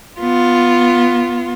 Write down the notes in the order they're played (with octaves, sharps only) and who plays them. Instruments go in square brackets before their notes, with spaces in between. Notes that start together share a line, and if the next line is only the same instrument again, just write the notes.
[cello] B3 F4